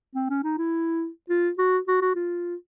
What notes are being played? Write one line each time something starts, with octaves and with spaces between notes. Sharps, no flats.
C4
C#4
D#4
E4
F4
F#4
F#4
F#4
F4